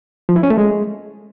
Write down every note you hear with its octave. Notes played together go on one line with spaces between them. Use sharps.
F3
E4
C#4
A3
G#3